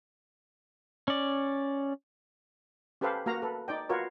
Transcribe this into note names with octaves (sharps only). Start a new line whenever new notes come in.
C#4 D5
C#4 G4 A4 B4 C5 F5
A#3 F#4 F5 A#5
A4 B4
D#4 D5 G5
F4 F#4 A#4 B4 C#5